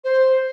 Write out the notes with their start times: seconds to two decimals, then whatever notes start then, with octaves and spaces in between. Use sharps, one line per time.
0.04 C5